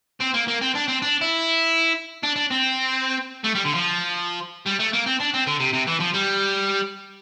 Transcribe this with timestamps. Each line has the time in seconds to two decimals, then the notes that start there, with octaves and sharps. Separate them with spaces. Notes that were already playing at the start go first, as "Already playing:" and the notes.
0.21 C4
0.34 A#3
0.48 A#3
0.61 C4
0.75 D4
0.88 C4
1.02 D4
1.22 E4
2.23 D4
2.36 D4
2.51 C4
3.44 A3
3.55 G3
3.65 D3
3.74 F3
4.66 G3
4.79 A3
4.93 A#3
5.06 C4
5.20 D4
5.34 C4
5.47 D3
5.60 C3
5.73 C3
5.87 E3
6.00 F3
6.14 G3